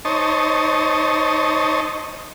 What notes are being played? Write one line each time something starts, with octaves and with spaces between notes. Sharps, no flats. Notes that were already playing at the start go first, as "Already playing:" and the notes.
D#4 C5 C#5 D#5 A5